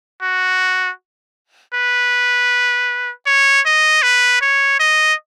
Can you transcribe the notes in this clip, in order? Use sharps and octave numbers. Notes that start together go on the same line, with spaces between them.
F#4
B4
C#5
D#5
B4
C#5
D#5